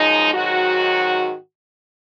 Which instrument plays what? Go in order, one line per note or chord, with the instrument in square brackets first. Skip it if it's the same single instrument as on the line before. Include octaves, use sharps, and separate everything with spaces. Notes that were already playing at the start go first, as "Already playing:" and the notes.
Already playing: [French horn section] F#2 F3 G#3 D#4
G#2 D#3 F#3 F#4